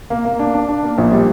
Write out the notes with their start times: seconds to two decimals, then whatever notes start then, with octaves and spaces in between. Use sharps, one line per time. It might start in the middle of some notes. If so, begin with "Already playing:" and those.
0.10 A#3
0.25 A#3
0.39 D4
0.54 D4
0.69 D4
0.83 A#3
0.98 A#1
1.12 G3